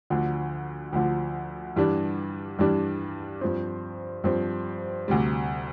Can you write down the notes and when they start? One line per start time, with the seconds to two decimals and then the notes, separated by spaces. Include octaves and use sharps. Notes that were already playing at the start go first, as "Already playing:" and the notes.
0.10 D2 D3 F3
0.93 D2 D3 F3
1.76 G2 E3 G3 D4
2.59 G2 E3 G3 D4
3.41 G2 F3 C4
4.24 G2 F3 C4
5.08 D2 C3 G3